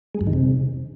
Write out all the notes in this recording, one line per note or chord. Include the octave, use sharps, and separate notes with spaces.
G#3
F#2
D#3
C3